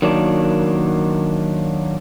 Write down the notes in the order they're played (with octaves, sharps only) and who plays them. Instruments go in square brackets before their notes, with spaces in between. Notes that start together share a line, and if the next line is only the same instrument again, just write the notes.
[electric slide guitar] D#3 F#3 A#3 D4